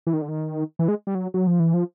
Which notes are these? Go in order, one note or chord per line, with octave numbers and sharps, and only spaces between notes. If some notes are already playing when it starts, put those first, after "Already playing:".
E3
D#3
D3
D#3
E3
G#3
G3
F#3
F#3
F3
E3
F3